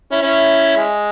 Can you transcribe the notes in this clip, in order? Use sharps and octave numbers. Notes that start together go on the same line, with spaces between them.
C#4 E4
C#4 E4
G#3